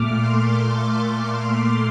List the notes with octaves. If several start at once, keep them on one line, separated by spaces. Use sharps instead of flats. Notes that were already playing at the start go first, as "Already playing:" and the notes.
Already playing: A#2 A3 D6 F6
C6